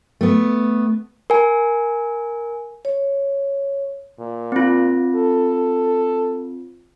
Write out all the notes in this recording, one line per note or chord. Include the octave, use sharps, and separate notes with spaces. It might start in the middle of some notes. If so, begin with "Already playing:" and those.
A3 B3
A#4 G#5
C#5
A#2
C4 F4
A4